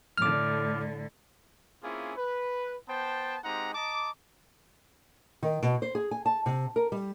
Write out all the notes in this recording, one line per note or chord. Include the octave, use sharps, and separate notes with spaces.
A2 D3 D6 F6
A#3 C4 C#4 E4 F4 G#4
B4
B3 C5 G5 A5
G#3 C4 D#4 G4 F#5 A#5
D#5 A5 A#5 D6
D#3
B2
C5
G#4
G#5
A5
C3
A#4
G3